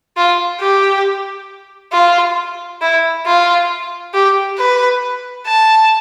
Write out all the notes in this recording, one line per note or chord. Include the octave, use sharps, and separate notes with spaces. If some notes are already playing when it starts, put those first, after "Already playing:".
F4
G4
F4
E4
F4
G4
B4
A5